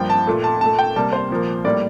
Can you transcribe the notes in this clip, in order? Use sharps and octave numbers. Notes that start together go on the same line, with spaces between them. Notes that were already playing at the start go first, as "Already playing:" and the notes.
Already playing: G2 F3 A#3 G5
A5
A#2 A3
A5
A#2 A3 A5
G5
C3 G3 A#3 A5
C5
A#2 F3 A#3
A2 G3 A#3 D5